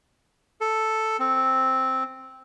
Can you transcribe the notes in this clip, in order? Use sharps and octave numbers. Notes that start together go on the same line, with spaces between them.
A4
C4